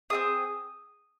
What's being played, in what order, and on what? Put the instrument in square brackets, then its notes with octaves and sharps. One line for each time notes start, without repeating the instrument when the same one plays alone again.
[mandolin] C4 F4 G#4 D#6